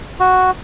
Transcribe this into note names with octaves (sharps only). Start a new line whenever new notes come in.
F#4